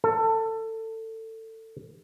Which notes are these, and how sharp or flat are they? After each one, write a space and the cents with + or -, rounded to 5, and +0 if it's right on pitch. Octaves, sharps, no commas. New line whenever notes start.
A4 +25